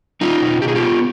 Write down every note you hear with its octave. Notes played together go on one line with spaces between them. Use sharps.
G3 D#4 F4
B2
B2 G4
G#4
F4 G4
B3